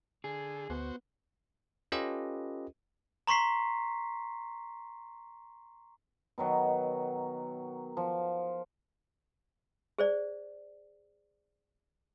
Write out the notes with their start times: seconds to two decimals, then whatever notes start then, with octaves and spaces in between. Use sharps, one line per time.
0.24 D3 G#4
0.70 D2 B3 F#4 C5
1.92 C#4 F4 G4 A4 B4 D#5
3.27 A#5 C6 C#6 B6 C7
6.38 B2 D#3 F#3
7.97 F3
9.98 G#4 C5 D5